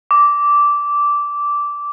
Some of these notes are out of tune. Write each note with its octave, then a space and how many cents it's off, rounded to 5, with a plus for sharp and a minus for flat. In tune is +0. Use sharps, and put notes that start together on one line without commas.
D6 -10